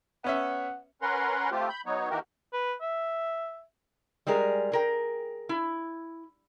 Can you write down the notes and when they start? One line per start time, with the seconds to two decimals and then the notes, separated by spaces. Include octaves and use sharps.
0.24 B3 C#4 E5 F#5
1.02 C#4 A#4 B4 F#5 A#5 C6
1.51 A3 C4 F4 G4
1.69 B5 G6
1.86 F#3 B3 D#4 C#5
2.10 D#3 E3 A#3 F#4 G4 A#4
2.53 B4
2.82 E5
4.27 G3 G#3 G#4 A#4
4.72 G#4 A#4 G5
5.49 E4